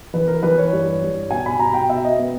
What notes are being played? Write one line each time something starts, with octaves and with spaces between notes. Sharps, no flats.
E3 B4
A#4
E3 B4
C#5
G2
G2
B2 G#5
B5
B2 A#5
G5
B2 E5
D#5
B3